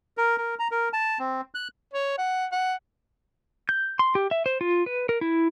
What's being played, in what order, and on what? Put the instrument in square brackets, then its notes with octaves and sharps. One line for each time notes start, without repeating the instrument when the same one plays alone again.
[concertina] A#4
A#4
A#5
A#4
A5
C4
F#6
[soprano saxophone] C#5
F#5
F#5
[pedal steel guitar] G6
C6
G4
E5
C5
F4
B4
A#4
E4